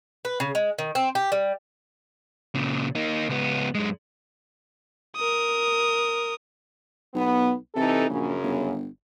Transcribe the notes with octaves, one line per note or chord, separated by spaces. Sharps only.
B4
C#3
G#3
D#3
C4
G4
G3
A#2 C#3
A#3 D#4
C#2 B3
F#2 G#3
A#4 D#6
B1 B3
C3 E3 D#4 A4
A#1 F#2 C#3
G1